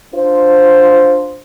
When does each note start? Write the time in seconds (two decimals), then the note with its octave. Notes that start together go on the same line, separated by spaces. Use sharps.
0.14 D4 F4 C5